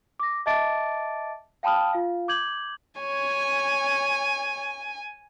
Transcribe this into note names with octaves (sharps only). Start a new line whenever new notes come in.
D6 A#6
D#5 E5 A5 D6 A6 D7
F5 G5 A5 B5 D#6 F6
F4 F5
D6 G6 G#6 F#7
C#5 G#5